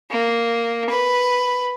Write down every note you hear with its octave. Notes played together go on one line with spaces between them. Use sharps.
A#3
B4